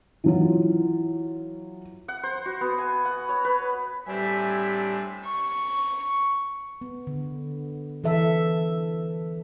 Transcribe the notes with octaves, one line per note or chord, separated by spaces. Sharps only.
E3 F#3 F4
F#5
C5
F#4
B3
G#5
F#5
C#5
B4
A2 G3 C4 D4 E5 G#5
C#6
B3
D3
E3 A4 E5